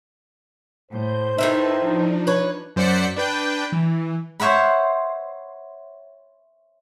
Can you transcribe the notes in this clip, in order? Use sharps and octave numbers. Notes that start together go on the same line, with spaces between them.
A2 C5 G6
A2 D#3 D#4 B4 E5 A5
F3 D4
B4 C#5
F#2 C5 D5 F#5 B6 C#7
D4 B4 G5
E3
C5 C#5 E5 F#5 B5